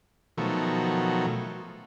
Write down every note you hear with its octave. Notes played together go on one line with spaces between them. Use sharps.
B2 D#3 F3 F#3 A3